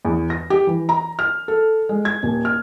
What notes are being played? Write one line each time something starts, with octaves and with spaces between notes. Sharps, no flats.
E2
A#6
G4
E3
A#5
F6
A4
G#3
G#6
D#1
F6